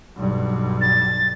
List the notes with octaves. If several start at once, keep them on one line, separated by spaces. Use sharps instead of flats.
B1 G2
A6